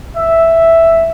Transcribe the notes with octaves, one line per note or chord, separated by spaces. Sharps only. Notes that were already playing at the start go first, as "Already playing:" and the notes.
E5